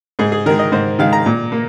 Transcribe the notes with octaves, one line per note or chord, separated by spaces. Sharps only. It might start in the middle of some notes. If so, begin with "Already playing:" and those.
G#2 G#4
G#4
D#3 G#3 A#4
D#5
G#2 C5
D#3 G#3 F5
A#5
A#2
A#3